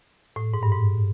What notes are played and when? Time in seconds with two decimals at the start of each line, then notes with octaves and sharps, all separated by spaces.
0.36 A2
0.54 G#2
0.63 G2
0.72 G#2